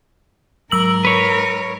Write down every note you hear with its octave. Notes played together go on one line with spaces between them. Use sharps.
G#2 F#3 A#4 E6 F#7
B4 C#5